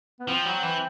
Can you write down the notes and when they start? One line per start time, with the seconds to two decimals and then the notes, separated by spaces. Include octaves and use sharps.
0.20 B3
0.28 F3 C4
0.45 F#3
0.63 E3